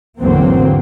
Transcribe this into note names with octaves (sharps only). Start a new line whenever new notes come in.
G#1 E2 D3 F#3 A#3 C4